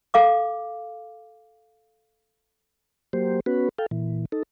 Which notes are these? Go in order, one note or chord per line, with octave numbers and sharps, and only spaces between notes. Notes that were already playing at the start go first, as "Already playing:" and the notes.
A4 F5 D6
F#3 A#3 G4 C5
B3 C#4 F#4 B4
A4 F5 G5
A#2 E3
D#4 A4